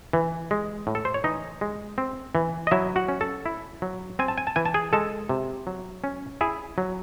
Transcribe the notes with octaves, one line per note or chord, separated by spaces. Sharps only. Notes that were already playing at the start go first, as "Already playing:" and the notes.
E3
G#3
A2
A4
C5
C#5
E3 D#4 D#5
G#3
C4
E3
D#5
F#3 E4 E5
F#4 F#5
C#4
A4 A5
E4
F#3
C4 G#5
A5
G#5
A5
E3 G#5
A5
G#4 G#5
G#3 A4 A5
C3
F#3
C#4
E4 G#4 G#5
F#3